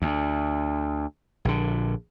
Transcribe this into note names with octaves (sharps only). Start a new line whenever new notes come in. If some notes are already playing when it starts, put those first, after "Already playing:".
D2
A#1 D3